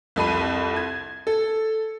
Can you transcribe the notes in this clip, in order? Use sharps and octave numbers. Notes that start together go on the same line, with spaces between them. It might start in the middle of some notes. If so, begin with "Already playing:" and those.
C2 F2 B5 D#7
G#6
A4